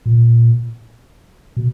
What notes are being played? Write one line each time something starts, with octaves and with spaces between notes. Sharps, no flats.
A#2
B2